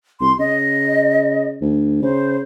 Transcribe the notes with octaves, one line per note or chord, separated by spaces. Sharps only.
C2 C6
C#3 D#5
D2
C#3 C5